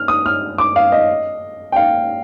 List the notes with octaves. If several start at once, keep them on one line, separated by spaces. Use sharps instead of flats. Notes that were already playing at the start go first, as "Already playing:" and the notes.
Already playing: F6
D#6
F6
D6
F5
D#5
G5
F5